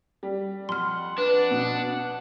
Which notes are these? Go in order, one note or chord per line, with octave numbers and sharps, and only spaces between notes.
G3
F2 F#5 C6 F6
D4 B4
B2